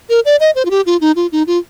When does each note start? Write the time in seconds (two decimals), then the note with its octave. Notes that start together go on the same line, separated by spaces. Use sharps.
0.09 A#4
0.25 D5
0.40 D#5
0.55 C5
0.65 F4
0.71 G4
0.86 F4
1.01 D#4
1.16 F4
1.32 D#4
1.47 F4